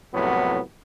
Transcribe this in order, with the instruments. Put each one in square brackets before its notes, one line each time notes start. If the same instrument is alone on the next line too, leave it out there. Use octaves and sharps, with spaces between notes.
[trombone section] C2 F2 A2 F#3 B3